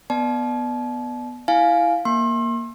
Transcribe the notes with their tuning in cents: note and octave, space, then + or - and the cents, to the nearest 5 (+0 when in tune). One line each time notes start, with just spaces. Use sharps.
B3 +0 D5 +20 A5 -30
E4 +0 F5 +0 G#5 +10
A#3 +0 C6 +40